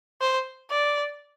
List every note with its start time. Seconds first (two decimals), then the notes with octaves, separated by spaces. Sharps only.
0.21 C5
0.70 D5